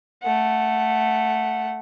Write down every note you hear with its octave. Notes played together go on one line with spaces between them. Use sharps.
A3 F#5